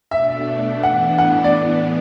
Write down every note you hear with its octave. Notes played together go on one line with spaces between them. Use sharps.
B2 A3 D4 E5
A2 E3 B3 D4 F#5
F#5
D5